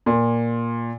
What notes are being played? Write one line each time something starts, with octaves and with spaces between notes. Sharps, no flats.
A#2